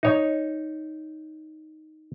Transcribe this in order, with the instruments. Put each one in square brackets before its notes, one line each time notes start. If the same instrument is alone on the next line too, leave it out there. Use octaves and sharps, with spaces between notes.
[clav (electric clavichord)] D#4 C#5